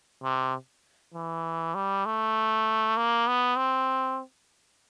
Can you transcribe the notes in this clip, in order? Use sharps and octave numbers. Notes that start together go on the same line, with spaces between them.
C3
E3
G3
A3
A#3
B3
C4